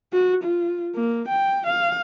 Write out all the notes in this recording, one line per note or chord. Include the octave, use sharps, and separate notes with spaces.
F#4
F4
A#3
G5
F5